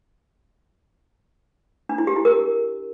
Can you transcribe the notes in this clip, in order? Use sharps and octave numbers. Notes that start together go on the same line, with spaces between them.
D4
E4
G4
E4
A#4